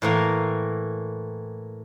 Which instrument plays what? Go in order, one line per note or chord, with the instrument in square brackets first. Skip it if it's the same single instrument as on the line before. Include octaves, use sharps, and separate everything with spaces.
[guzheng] A2 E3 A#3 A#5